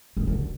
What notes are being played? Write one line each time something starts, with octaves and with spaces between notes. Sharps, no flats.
D#3
D3